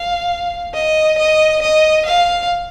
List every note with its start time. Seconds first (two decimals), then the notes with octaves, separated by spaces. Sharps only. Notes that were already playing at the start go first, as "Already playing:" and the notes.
Already playing: F5
0.74 D#5
1.18 D#5
1.62 D#5
2.06 F5